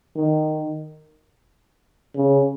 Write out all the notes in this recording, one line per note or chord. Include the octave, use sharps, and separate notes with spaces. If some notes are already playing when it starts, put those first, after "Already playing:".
D#3
C#3